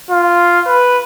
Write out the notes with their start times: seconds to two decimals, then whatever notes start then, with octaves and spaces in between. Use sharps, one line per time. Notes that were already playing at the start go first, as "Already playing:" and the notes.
0.11 F4
0.67 B4